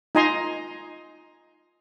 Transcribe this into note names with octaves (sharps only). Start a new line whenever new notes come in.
D#4 F4 D#5 G#5 A#5 C6